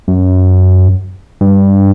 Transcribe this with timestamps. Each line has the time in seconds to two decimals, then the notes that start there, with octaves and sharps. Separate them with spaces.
0.08 F#2
1.41 G2